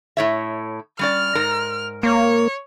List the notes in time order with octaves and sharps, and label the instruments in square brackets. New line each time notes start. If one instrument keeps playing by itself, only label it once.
[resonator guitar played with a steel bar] A2 C#5 E5
[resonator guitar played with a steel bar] G3 C#4 D5 [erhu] F6
[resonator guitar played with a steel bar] G#2 A#4 A#5
[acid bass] A#3 [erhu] C#5